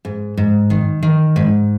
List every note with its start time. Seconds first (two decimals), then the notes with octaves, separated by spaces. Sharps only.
0.05 G#2
0.37 G#2
0.70 D#3
1.03 D#3
1.36 G#2